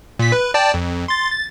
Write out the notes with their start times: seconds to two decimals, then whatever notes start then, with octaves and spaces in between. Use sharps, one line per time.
0.19 A#2 B6
0.32 B4
0.54 D5 G5 A5
0.74 F2
1.08 C6 A6
1.32 A6